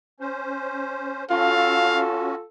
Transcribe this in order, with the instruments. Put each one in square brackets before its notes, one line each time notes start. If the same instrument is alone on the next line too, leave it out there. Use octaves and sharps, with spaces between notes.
[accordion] C#4 C5
[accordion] C#4 F#4 [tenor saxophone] F4 [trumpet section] A4 [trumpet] F5